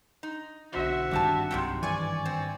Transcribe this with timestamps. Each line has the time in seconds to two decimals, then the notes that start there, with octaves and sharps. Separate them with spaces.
0.23 D#4
0.73 B1 D3 F#4 C5 E5
1.11 G#1 G2 D#3 D4 G4 A5
1.51 C2 F2 G#2 C3 F#3 G5
1.82 E3 D5 G#5 C#6
2.25 C4